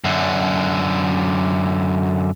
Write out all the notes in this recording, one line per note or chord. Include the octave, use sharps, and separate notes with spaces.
F#2 D3